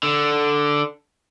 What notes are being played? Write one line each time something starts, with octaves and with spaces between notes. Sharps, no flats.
D3